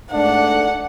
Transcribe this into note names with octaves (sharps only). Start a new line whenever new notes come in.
G#2 A3 D4 F#5